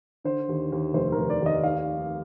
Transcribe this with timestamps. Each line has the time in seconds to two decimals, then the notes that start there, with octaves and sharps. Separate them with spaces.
0.25 D3 C5
0.48 D#2
0.72 D#2
0.94 F1 C5
1.12 F1 A#4
1.30 D5
1.41 D#2 D#5
1.63 F5